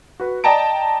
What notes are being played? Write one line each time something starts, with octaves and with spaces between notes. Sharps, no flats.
F#4 B4
D5 D#5 G5 A5 A#5 D7